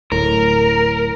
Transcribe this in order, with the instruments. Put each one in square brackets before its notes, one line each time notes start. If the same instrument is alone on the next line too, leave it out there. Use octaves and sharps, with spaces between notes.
[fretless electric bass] D1 A2 [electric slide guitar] A#4